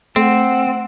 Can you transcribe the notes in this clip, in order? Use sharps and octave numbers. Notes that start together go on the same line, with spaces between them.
A3 C4 F#5